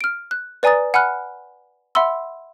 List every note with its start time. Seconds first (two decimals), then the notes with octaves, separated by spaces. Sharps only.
0.01 F6 D7
0.31 F#6
0.63 B4 D5 G#5 A#5 D#6 A6
0.94 F#5 G#5 B5 F6 F#6
1.95 E5 F#5 B5 C6 E6